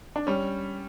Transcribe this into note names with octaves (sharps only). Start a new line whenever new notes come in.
D4
G3 C#4